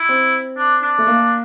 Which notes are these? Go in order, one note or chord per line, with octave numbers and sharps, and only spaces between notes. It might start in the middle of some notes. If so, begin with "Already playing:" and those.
Already playing: E4
C4
D4
D4
A3
A#3